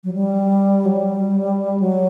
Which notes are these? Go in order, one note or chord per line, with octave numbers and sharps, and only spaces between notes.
F#3
G3
F#3
G3
F#3